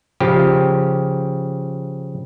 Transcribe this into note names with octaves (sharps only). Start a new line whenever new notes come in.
C#3 F3 G4